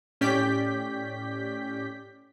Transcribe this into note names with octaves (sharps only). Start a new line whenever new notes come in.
A2 C#4 G4 D5 G6 B6